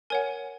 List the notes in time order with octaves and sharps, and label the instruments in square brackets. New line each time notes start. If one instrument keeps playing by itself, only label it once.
[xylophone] A#4 C#5 F#5 G#5